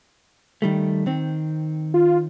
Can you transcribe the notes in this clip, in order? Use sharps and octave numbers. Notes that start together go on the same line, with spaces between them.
D#3 G3 A3
D#3 C4
F4